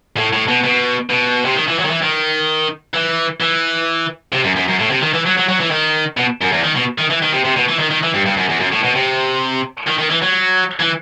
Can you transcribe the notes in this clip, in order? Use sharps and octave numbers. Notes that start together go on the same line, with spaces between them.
A2
A2
B2
B2
B2
C3
D#3
E3
F#3
D#3
E3
D#3
E3
E3
C3
F#2
F#2
F#2
A2
C3
D#3
E3
F#3
F#3
F#3
E3
D#3
B2
F#2
E2
D#3
B2
D#3
E3
D#3
C3
C3
B2
E3
D#3
D#3
E3
G2
G2
F#2
E2
F#2
A2
B2
C3
D#3
D#3
E3
F#3
E3